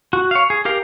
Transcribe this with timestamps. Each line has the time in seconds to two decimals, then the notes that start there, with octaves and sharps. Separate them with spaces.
0.13 F#4
0.31 C#5 F5
0.50 G#4
0.65 G4 A#4 F5